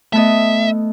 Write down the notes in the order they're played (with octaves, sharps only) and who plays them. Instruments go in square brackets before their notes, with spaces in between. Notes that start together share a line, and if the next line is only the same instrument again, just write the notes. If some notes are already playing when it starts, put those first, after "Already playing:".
[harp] A3 B3 D#5 [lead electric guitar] E5